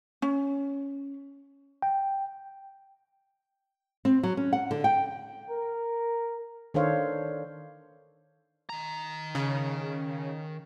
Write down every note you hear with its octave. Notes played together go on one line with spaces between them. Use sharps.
C#4
G5
C4
F#3
C#4
F#5
D3
G5
A#4
D#3 D4 A4 C5 C#5 F5
D#3 A#5
C#3